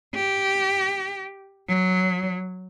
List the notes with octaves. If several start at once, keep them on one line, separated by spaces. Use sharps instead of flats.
G4
F#3